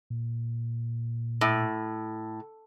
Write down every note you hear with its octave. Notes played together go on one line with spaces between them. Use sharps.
A#2
A2